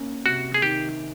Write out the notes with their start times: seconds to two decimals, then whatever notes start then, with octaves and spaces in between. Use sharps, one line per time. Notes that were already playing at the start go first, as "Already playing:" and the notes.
Already playing: A#3 C#4
0.25 C3 F#4
0.54 G#4
0.62 D#3 G4